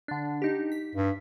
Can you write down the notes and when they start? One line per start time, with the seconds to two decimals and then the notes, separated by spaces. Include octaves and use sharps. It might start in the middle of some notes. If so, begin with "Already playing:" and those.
0.08 D3 D4
0.42 D#4 G4
0.72 B6
0.95 G2